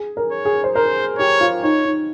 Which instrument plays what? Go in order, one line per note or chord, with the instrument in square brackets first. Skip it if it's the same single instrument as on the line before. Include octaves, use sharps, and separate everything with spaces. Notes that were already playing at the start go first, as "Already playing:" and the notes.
Already playing: [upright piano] G#4
A#4
[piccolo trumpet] C#5
[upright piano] G#4
C5
[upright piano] A#4 [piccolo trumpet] C5
[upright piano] G4 [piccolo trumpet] C#5
[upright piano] F4
[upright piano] D#4 [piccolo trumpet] C#5
[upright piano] D#4